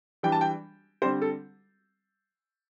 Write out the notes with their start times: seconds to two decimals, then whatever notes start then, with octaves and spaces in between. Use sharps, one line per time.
0.23 E3 G3 D4 G5
0.32 A5
0.41 G5
1.02 D3 G3 C4 C5
1.22 A4